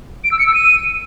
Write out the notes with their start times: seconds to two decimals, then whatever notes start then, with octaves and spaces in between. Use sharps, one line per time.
0.24 D7
0.32 E6
0.39 C#7
0.46 E6
0.54 D#7